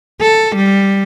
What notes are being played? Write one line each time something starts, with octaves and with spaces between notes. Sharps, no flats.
A4
G3